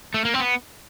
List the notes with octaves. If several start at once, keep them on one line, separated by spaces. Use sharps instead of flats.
A3
A#3
C4
B3